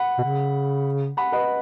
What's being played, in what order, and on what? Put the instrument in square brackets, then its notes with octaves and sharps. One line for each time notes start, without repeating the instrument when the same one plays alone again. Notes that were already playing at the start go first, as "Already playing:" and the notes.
Already playing: [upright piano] F#5 B5
[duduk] B2
C#3
[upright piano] F#5 B5
B4 D#5